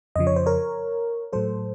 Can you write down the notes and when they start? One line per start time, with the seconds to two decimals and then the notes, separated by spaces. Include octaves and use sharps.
0.16 F2 C#3 F3 D#5
0.27 C#5
0.36 C5
0.46 A#4 C#5
1.33 A2 F#3 A4 C5